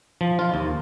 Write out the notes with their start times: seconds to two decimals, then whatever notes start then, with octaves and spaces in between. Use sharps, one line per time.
0.21 F3
0.39 F4
0.54 D#2